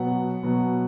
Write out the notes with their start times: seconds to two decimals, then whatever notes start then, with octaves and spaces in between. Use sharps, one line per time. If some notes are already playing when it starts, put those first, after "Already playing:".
Already playing: B2 F#3 B3 F#5
0.43 B2 F#3 B3